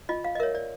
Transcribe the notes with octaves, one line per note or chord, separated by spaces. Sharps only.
F4 D#5
F5
D#5
A#4 C#5 E5
D5